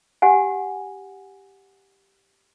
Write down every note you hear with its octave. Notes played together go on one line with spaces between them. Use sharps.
G4 F#5 G#5